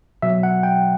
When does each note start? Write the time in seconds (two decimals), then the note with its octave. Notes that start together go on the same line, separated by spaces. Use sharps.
0.22 B2 F#3 E5
0.43 F#5
0.63 G5